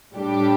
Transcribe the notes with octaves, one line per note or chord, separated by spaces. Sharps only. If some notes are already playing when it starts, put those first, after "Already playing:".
A2 G3 D4 G4